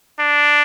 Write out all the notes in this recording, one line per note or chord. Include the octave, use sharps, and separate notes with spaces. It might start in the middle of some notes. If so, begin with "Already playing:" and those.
D4